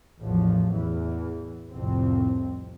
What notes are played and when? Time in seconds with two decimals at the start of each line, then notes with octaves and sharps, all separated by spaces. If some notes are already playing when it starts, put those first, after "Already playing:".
0.20 A1 E2 G2 F3 F#3
0.74 E2 E3
1.72 C2 F2 A2 C4